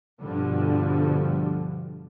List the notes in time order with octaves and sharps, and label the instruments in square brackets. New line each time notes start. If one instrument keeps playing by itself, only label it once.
[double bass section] G2 B2 D3 F3 G3